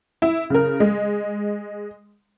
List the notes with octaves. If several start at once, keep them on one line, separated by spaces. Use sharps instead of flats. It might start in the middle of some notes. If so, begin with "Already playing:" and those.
E4
C#3 A#4
G#3